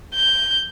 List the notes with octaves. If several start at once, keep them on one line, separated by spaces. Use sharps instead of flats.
G6